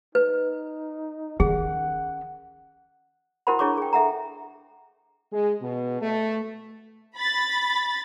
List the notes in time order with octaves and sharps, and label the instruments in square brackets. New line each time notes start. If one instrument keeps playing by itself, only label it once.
[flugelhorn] D#4 [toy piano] B4
[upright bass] D#3 C#4 [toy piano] G#4 [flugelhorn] F#5
[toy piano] E4 F#4 A#4 C5 F#5 B5
D4 E4 G#4 C#5 C#6 D6
G#4 G5
A4 E5 F#5 A#5
[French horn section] G#3
B2
A3
[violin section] B5 A6